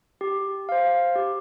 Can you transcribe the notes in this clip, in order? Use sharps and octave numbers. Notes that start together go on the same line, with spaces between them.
G4
C5 F5
G4